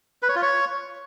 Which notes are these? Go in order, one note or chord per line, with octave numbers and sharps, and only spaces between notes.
B4
C#5
F4
C#5